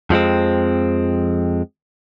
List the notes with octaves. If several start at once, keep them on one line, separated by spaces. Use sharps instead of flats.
F2 F3 G#3 C4